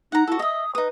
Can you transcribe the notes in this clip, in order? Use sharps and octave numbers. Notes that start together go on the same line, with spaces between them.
D#4 F#5 A#5
E4 F#4 A4
D#5 E5 D#6
D#4 B4 D#6